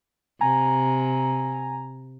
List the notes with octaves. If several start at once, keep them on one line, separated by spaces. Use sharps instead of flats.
C3 G#5 A#5